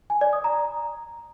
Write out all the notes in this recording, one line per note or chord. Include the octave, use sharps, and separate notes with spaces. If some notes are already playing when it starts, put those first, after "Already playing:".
G#5
D5
D#6
A#5